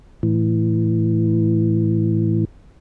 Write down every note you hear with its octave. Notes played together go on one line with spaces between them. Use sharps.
A2 E3